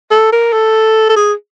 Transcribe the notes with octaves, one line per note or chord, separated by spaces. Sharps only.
A4
A#4
A4
A4
G#4